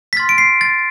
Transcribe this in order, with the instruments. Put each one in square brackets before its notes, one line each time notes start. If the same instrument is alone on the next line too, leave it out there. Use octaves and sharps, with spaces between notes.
[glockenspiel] B6
C6 F6 A6
D7
C7
A6